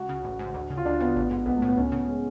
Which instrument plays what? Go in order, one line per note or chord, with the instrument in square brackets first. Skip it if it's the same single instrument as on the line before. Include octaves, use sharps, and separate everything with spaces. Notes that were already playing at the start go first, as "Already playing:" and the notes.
Already playing: [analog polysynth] C#2 [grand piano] F#4
[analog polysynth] C#3
A1
G#2
D2
C#3
[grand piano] F4
[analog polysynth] D2 [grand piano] D4
[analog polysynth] C#3 [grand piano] B3
[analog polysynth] A1
G#2
[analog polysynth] B1 [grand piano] B3
[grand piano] A3
[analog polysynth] A2
[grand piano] B3
[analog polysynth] C#2 [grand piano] C#4
[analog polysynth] C#3 [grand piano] B3
[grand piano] G#3